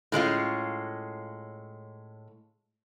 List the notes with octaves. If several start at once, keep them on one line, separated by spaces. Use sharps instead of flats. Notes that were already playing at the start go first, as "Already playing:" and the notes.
A2 G#3 C#4 F4